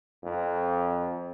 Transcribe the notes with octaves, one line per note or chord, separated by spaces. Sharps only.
F2